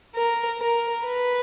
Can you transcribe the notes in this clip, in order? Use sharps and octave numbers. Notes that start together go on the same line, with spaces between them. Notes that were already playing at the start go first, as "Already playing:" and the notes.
A#4
A#4
B4